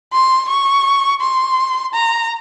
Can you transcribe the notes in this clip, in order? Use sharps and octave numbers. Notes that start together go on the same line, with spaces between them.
C6
C#6
C6
A#5